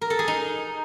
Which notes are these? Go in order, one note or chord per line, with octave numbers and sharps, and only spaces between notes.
A#4
A4
G#4
D#4